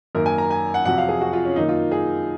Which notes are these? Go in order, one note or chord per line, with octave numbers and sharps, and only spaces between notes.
F#2 D#3 A#3 A#4
G#5
A#5
G#5
F#5
F2 C3 F#3 F#5
F5
G#4
F#4
F4
C#4
F#2 D#3 A#3 D#4
F4
G#4